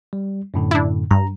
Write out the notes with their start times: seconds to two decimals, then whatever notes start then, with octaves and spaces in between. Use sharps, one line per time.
0.13 G3
0.54 F#2 A2 D3
0.71 D4 E4
1.11 G2 A#5